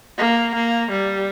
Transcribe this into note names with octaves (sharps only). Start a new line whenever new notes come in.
A#3
A#3
G3